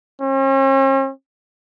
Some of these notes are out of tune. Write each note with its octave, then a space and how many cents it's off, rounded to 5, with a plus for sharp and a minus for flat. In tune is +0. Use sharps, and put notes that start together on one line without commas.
C#4 -45